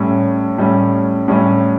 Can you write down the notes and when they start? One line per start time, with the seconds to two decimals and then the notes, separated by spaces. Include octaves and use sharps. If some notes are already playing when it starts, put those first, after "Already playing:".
Already playing: A2 G3 C#4
0.58 A2 G3 C#4
1.28 A2 G3 C#4